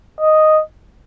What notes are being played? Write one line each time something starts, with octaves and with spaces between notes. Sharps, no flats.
D#5